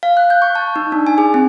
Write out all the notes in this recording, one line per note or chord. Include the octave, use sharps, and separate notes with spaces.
F5
F#6
G6
C#6
A5
D#4
D4
G#5
G#4
C4